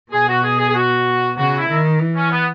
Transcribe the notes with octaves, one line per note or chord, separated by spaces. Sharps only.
B2 G#4
F#4
G#4
G#4
G#4
F#4
C#3 F#4
E4
D#3
E3
C#4
B3